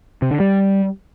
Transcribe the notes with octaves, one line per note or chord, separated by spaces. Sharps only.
C3
D3
G3